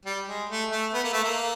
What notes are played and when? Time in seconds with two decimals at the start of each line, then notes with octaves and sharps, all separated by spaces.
0.05 G3
0.27 G#3
0.49 A3
0.70 A3
0.94 B3
1.04 A#3
1.13 A3
1.23 A#3